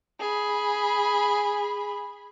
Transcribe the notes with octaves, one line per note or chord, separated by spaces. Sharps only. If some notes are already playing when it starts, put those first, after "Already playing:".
G#4 B5